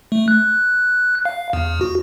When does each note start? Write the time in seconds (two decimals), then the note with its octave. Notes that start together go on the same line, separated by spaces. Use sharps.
0.12 A3
0.28 F#6
1.25 F5
1.53 E2
1.81 F#4